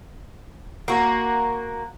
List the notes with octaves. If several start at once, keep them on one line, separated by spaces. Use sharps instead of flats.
A#3 F#4